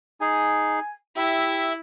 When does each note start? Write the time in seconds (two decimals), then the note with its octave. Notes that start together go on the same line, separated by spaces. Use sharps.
0.21 D#4 G#4 G#5
1.16 E4 G4 E5